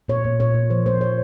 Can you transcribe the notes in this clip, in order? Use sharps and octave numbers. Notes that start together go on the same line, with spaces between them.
A#2 C#5
A#2
A#2 C#5
A#2
F3 C5
A#3 C5
A#3 C#5